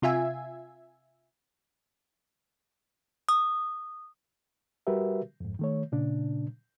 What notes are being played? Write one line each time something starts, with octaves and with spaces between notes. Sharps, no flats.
C3 F4 E5 G#5
D#6
G3 F#4 G4 A#4 B4 E5
F2 G#2
D#3 A3 C#5
A#2 C#3 D4